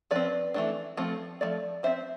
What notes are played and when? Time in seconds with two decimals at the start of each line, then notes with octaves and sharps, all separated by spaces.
0.11 F3 C4 B4 D5
0.54 E3 A3 D4
0.97 F3 A3 C4
1.41 F3 A3 D5
1.83 F3 C4 C5 E5